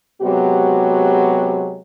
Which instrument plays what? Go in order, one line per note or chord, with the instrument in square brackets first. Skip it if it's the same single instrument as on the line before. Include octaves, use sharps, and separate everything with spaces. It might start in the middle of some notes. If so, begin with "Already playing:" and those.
[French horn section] C3 F#3 G#3 B3 F#4 G4